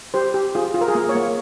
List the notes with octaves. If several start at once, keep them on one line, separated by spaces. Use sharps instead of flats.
G4 C5
G4
F4 G#4
F4
A#4
G#4
A#3 A#4
C#5
A#3